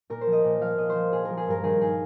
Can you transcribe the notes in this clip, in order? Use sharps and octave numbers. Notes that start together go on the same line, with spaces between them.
A#2 A#4
C5
F3
D#5
A#2
F3 F5
A#2 D#5
C5
F3
A#2 G#4
F3 A#4
G#4
G2 A#4
D#3 G#4
G2 G#4